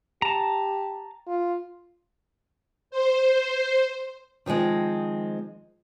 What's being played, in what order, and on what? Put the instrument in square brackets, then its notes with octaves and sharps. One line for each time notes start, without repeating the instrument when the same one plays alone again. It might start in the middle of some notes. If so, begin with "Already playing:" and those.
[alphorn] G4 [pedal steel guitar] A5 A#5
[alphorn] F4
[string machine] C5
[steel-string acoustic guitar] D#3 F3 G3 G#3 C4